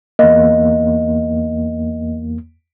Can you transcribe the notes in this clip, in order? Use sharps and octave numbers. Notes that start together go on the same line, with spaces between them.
E2 A#3 D#5